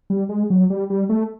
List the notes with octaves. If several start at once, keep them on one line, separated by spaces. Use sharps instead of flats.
G3
G#3
F#3
G3
G3
A3